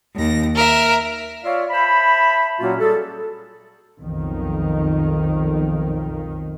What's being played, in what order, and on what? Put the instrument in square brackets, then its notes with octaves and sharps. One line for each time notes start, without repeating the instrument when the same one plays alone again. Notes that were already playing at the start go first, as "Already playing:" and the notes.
[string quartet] D#2 A#6
A#4 E5
[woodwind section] F4 C#5 D5 E5 F5
C5 E5 A5 B5
A#2 F#3 A#3 C#4 F4 F#4
G3 F#4 G#4 A4
[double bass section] B1 F2 D#3